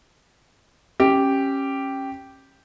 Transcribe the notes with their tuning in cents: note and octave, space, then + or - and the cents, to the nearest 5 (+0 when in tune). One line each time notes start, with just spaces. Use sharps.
C#4 -20 G4 -5